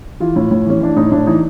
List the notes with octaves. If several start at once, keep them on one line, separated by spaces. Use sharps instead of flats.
E3 F4
A2
A2
E3 C#4
E3 D4
A2 D#4
A2 D4
E3 D#4